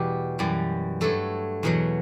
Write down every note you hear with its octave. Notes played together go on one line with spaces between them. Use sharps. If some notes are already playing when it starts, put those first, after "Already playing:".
Already playing: E2 B2 G3 G4
F#2 E3 G3
G2 F#3 A3 A4
E2 B2 F#3